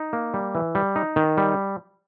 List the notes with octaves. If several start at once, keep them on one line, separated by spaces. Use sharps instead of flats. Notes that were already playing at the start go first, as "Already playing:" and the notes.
Already playing: D#4
A#3
G3
E3
G3
D#4
D#3
G3